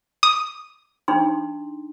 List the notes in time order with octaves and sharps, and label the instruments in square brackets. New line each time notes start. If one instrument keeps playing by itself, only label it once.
[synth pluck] D#6
[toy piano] D4 D#4 C6